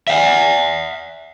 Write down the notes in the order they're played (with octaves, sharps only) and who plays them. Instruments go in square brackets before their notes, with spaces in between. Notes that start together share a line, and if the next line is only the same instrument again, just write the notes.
[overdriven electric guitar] E5 F#5